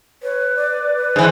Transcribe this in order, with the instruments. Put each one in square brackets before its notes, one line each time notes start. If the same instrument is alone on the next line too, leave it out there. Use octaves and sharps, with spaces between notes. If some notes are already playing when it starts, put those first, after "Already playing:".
[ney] B4 [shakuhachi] C#5
[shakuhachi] D5
[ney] B4
[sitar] G#2 E3